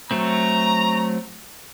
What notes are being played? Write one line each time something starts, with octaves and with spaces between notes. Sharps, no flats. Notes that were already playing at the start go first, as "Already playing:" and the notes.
F#3 A3 C4 A#5